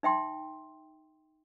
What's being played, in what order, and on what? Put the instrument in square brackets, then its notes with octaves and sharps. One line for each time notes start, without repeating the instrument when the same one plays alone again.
[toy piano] D#4 E5 G5 C6